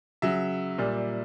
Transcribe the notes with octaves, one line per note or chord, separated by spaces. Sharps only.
C#3 F#3 E5
A#2 G3